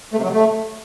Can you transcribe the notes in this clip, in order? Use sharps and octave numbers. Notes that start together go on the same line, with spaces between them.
A3
C3
F#3
C3
A3